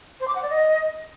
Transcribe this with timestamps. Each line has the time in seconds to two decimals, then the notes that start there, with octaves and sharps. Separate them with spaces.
0.20 C5
0.28 D6
0.35 F#5
0.43 D5
0.50 D#5